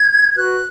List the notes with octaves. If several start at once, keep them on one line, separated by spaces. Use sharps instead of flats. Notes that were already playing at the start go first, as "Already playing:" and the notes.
Already playing: G#6
G#6
F#4 B4 F#6